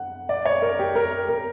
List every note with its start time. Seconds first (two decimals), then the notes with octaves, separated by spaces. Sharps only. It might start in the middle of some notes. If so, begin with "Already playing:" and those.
Already playing: F#5
0.29 D5
0.45 C#5
0.62 A#4
0.79 G4
0.95 A#4
1.29 A#4